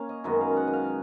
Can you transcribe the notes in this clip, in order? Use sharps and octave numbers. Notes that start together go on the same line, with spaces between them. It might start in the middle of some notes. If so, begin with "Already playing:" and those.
Already playing: A#3 C#4 F5 G#5
D#5
F#2 D#3 G#3 B3 D#5
F5
F#5
D#5
F5